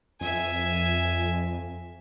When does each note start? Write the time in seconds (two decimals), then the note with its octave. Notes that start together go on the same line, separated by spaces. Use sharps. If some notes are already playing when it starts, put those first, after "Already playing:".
0.21 F2 E5 G#5